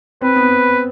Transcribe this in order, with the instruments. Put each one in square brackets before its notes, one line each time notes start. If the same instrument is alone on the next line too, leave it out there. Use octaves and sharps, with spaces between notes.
[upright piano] C4 [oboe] B4
[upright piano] B3